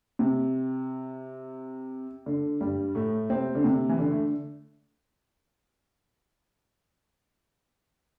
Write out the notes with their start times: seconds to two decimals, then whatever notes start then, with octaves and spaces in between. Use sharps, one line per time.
0.19 C3
2.26 D3
2.61 G2 G3
2.95 A2 A3
3.30 C3 C4
3.55 D3
3.64 C3
3.89 E3
3.99 D3
4.11 A3